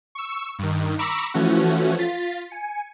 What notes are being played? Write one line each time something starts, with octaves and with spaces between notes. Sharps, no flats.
C#6 E6
G2 D#3
A#5 B5 C#6 D6 E6
E3 F3 A3 C#4 F#4
F4 A6 B6
G#5 C#7